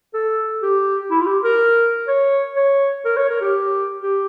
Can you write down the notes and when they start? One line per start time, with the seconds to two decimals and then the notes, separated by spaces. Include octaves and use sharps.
0.14 A4
0.62 G4
1.11 E4
1.20 F4
1.26 G4
1.44 A#4
2.08 C#5
2.56 C#5
3.05 A#4
3.17 C#5
3.29 A#4
3.41 G4
4.02 G4